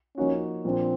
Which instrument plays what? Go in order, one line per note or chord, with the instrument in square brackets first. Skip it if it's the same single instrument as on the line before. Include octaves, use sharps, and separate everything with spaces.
[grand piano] F3 A#3 D#4 F#4 [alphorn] C#4
[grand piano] A#2 F3 A#3 D4 [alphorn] C4